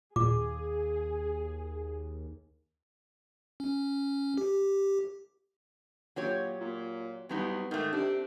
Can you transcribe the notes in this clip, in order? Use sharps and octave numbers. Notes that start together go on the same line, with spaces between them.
D#2 A#2 G#4 D6
C#4
G4
A#2 F#3 G4 C#5
A#2
C2 F#3 B3 D#4
G#2 D#3 A3
C3 D4